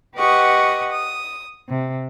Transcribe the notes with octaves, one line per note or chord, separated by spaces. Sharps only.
G4 B4 D#5 F#5 C#6 D#6
D#6
C3